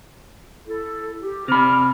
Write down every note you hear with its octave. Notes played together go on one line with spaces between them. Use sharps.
E4 A4
G4
C3 B5 D6 F6